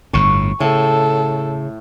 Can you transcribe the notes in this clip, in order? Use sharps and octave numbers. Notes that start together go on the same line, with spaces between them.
G1 A2 C#6
A2 C#3 A4